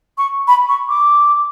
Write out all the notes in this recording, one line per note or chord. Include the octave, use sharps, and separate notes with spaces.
C#6
B5
C#6
D6